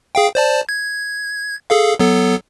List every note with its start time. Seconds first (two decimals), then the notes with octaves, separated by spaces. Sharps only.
0.15 G#4 F5 G5
0.35 C5 D5 A5
0.69 G#6
1.70 G#4 A4 F5
1.99 F#3 B3 A4